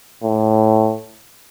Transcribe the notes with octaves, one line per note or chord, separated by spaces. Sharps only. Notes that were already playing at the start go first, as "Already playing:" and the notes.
A2